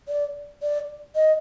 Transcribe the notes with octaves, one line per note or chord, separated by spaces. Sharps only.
D5
D5
D#5